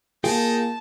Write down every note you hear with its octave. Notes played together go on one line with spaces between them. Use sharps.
A#3 D#4 F4 G#4 G5 A5